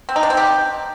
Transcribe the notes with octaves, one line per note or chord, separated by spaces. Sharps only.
C4
D#4
D4
C4
G4